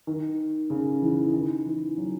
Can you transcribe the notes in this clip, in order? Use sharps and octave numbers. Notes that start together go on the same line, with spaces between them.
D#3
C#3
E3
E3
D#3
E3
F#3